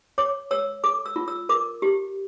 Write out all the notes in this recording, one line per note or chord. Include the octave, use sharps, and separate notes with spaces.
C#5 D6
C#5 E6
A4 D6
E6
F4
E6
A#4 D6
G4